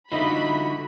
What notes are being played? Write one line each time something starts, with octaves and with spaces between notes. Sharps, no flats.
D3 D#4 F4 F#4 D#5 E5 B5